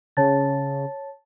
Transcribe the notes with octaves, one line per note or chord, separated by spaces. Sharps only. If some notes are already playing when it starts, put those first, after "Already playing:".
C#3 C#5 A5 A6